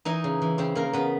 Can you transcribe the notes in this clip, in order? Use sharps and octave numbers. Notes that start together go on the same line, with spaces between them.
E3 D#4 D#5
C#3
E3
C#3 C4 C5
C#3 A#3 A#4
C#3 B3 B4